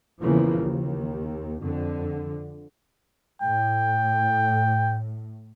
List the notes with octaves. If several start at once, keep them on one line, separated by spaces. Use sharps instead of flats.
E2 C#3 E3 F3 A#3
D#2
F2 D3
A2 G5